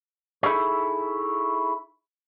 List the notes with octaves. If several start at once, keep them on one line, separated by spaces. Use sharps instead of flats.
D#4 E4 G#4 A4 C#5